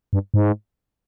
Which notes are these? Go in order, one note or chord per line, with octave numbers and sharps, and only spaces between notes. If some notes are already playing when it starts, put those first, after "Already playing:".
G2
G#2